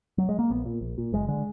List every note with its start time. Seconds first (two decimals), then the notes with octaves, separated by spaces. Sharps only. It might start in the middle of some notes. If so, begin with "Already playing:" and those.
0.18 F#3
0.29 G#3
0.39 A#3
0.50 A#1 B3
0.65 A#2
0.81 A#1
0.98 A#2
1.12 F#1 G#3
1.28 D3 G#3